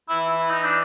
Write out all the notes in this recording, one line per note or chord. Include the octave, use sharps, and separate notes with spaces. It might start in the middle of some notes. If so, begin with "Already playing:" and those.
E3 E4
E4
D#4
D4